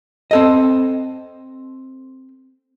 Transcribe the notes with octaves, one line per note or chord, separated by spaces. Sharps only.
C4 A4 D#5